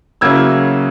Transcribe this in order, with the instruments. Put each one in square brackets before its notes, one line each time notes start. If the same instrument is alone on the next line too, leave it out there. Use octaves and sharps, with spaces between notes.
[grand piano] C#3 F#3 A#3 C#4 E4 E6 G#6